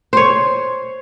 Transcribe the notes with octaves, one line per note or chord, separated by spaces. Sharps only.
C5 C#5